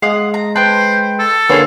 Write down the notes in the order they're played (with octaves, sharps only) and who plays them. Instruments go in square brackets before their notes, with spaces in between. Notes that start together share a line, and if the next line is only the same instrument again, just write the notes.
[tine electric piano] G#3 [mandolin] F5 F#5 D#6
[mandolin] A#5
[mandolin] B4 G5 [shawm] C5 [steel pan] A5
[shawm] A4
[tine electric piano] D3 A#3 C#4 [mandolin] F4 G#4 [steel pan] B4 C#5